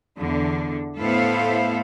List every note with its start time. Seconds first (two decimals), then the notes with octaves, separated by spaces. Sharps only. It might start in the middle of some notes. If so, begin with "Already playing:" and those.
0.20 E2 D3
0.99 A2 B3 E4 A4 C5 F5